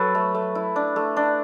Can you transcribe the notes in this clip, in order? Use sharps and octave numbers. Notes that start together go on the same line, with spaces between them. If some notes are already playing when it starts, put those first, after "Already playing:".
Already playing: F#3 A4 B4
A3
A3
E4
D4
A3
D4